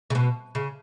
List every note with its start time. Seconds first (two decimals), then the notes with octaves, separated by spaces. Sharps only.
0.10 C#3
0.15 B2
0.55 C#3